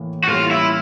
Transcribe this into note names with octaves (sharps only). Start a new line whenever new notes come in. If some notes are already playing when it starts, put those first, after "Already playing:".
Already playing: A2 E3 A#3
F#4
A2 E3 G3 A#3 C#4 F4
E4